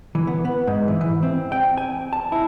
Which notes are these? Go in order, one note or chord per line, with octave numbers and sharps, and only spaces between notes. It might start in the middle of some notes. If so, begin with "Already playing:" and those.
E3
B3
B3
G#2
E3
E3
C4
G5
G#5
A5
E4